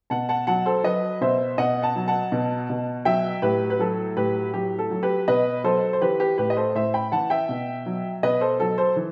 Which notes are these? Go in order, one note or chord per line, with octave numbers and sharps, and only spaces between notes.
B2 F#5 A5
F#5 A5
F#3 F#5 A5
A4 C5
F#3 B4 D#5
B2 C5 E5
B2 D#5 F#5
F#5 A5
F#3
F#5 A5
B2
B2
F#3 E5 G5
A2 G4 B4
B4
F#3 A4
A2 G4 B4
F#3 G4
A4
F#3
G4 B4
B2 B4 D#5
F#3 A4 C5
C5
E3 G4 B4
G4 B4
A2 G4 B4
D#5
A4 C5
A2 C5 E5
G5 B5
E3 F#5 A5
E5 G5
B2
F#3
B2 B4 D#5
A4 C5
F#3 A4
A4 C5
E3